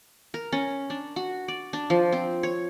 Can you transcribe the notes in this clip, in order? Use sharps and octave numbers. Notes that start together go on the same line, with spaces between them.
A#4
C#4
D4
F#4
D5
D4
F3
C4
C#5